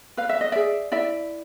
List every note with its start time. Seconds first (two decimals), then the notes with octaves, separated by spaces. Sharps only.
0.17 B4 F5
0.29 E5
0.41 D#5
0.52 G#4 D5 E5
0.92 E4 D5 E5